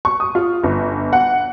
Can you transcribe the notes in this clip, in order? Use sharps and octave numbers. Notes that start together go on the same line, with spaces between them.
C#6
D#6
F4
G1
F#5